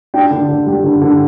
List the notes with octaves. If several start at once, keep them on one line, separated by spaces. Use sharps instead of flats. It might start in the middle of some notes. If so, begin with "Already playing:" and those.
D4 G5
D3
D3
G3
D3
D3